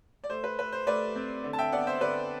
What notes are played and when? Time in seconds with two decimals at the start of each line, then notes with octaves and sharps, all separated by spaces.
0.24 D5
0.29 A3 C5
0.44 B4
0.58 A3 B4
0.72 C5
0.87 A3 B4 D5
1.16 C4
1.44 D3
1.53 A5
1.58 E5 G5
1.72 B3 D5 F#5
1.87 C5 E5
2.01 D3 B4 D5